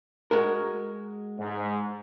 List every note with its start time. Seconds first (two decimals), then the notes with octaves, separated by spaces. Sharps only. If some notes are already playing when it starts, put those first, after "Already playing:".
0.31 G#3 F#4 A#4
1.38 G#2